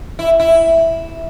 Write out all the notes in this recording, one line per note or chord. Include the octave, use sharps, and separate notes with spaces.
E4
E4